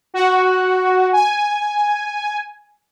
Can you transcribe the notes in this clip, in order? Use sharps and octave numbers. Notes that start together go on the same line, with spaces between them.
F#4
G#5